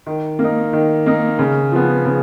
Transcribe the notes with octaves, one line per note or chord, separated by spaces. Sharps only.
D#3
A#3
D#4
D#3
A#3 D#4
C#3
F3 B3
C#3